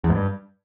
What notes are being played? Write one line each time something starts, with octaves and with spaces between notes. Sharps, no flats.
E2
G#2
G2